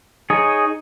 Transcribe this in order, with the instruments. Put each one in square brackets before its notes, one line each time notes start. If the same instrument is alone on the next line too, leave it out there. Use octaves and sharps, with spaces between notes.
[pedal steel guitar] D#4 G#4 C#5